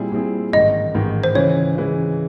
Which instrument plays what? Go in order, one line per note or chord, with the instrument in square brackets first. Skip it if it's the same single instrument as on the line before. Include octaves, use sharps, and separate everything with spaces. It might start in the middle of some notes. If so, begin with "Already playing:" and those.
Already playing: [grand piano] A#2 G3 C4 E4 G#4
A#2 G3 C4 E4 G#4
[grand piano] A1 G#2 D#3 [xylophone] D#5
[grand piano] A1 G#2 D#3
[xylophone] C5
[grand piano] C#3 E3 G#3 [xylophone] C#5
[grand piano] C#3 E3 G#3